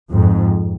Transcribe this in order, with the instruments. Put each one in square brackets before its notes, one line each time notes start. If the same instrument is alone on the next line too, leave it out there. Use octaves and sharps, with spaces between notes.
[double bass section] F2 G#2